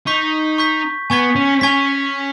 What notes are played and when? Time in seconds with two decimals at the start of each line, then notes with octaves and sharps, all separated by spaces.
0.07 D#4 C#6 G6 B6
0.58 C#6 G6 B6
1.10 B3 G#5 C#6 G#6 B6
1.36 C#4
1.61 C#4 G#5 C#6 G#6 B6